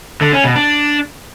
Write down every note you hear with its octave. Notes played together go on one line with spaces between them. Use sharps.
D3
C#4
B2
D4